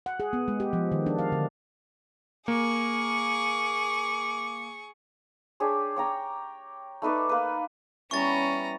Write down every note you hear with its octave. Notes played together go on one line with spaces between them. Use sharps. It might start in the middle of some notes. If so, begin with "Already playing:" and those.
F#5
G#4
B3
G#3
G4
F3
D#3
D4
F5
D3
A#3 G#4 C#6 D6
D4 G4 G#4 C#5
C#5 G5 A#5
A3 D#4 B4 D5
A#3 B4
E3 G3 B3 C#4 A#5 C#6 A6